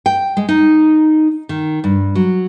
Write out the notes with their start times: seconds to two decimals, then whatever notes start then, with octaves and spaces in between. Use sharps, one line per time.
0.06 G5
0.37 G#3
0.49 D#4
1.49 D#3
1.84 G2
2.15 F#3